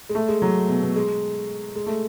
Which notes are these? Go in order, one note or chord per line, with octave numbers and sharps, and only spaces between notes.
G#3
A3
G#3
F#3
B2
B2
G#3
G#3
A3